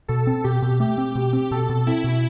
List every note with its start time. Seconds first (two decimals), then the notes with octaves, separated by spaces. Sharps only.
0.08 B2 A4
0.27 C4
0.44 B2 G4
0.62 B2
0.80 A3 G4
0.98 C4
1.15 B2
1.33 C4
1.51 B2 A4
1.69 B2
1.87 C4 E4
2.04 B2